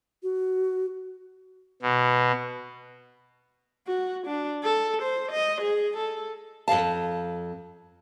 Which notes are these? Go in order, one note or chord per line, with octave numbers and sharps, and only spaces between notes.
F#4
B2
F#4
D4
A4
C5
D#5
G#4
A4
F2 G#3 F5 A5